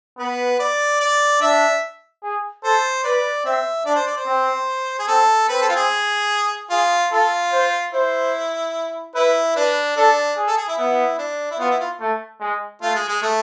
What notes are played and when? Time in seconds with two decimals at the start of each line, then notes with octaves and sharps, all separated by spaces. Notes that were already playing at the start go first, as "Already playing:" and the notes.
0.19 B3 B4
0.59 D5
1.01 D5
1.41 D4 E5
2.23 G#4
2.64 A4 C5
3.04 B4 D5
3.45 C4 E5
3.85 D4 D5
3.96 C5
4.06 D5
4.17 C5
4.26 C4
4.99 G#4
5.07 C4 A4
5.48 C4 B4
5.62 A4
5.69 F4
5.76 G#4
6.70 F4 G#4
7.12 F4 A4
7.52 C5
7.93 E4 C5
9.15 E4 B4
9.55 D4 B4
9.97 D4 A4
10.37 G#4
10.47 A4
10.57 G#4
10.68 E4
10.78 B3 E4
11.18 D4
11.51 E4
11.59 B3 F4
11.70 E4
11.80 F4
12.00 A3
12.40 G#3
12.81 A3 F4
12.95 G#3
13.08 G#3
13.22 A3